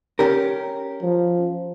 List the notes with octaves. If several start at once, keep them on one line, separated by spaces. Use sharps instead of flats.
C#4 G4 A#4
F3